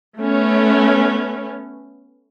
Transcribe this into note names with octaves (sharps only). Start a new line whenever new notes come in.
A3 B3 C#4